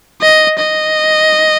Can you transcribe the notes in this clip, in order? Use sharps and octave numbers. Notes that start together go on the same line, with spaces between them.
D#5
D#5